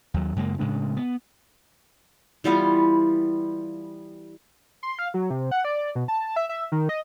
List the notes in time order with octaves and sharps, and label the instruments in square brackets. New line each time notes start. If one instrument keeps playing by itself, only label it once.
[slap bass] D#2 F#3
F#2 C#3 G#3 A#3
A2 C#3 G#3 D4
B3
[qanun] E3 G3 B3 F4
[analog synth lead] C6
F5
F#3
C3
F#5
D5
B2
A5
E5
E5
D#3
D#5